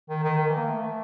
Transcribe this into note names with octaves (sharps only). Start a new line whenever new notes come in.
D#3
D#3
D#3
E3
A#3
A3